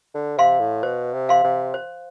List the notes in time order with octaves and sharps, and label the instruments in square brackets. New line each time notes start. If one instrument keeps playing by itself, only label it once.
[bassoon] D3
[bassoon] C3 [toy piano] F5 C6
[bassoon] A2
[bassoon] B2 [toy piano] C5
[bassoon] C3
[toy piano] F5 C6
[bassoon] C3
[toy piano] C5